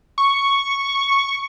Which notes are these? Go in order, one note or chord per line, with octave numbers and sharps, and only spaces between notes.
C#6